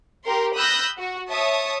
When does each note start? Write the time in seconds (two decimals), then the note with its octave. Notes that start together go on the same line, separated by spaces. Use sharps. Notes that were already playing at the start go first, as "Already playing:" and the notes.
0.25 G4 A#4 C6
0.56 B5 D#6 E6 F#6 G6 A#6
0.98 F#4
1.30 C#5 E5 A5 D#6